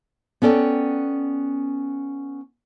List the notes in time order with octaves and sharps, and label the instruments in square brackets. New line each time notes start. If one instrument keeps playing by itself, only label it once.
[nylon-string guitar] B3 C#4 A4 D5 G5